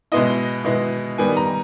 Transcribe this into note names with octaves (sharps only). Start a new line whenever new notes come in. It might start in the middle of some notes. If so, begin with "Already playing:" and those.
B2 G#3 B3 E4 D#5
B2 G#3 B3 E4
D#3 G3 B3 G#5
A#5